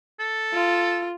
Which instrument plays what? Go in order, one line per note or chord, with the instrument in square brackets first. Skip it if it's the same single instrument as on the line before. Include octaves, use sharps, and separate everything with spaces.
[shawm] A4
[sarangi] F4